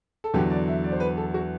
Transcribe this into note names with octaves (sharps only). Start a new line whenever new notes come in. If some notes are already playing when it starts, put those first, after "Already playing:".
A4
E2 D3 F#3 G4
D5
E5
D5
C5
B4
A4
F#4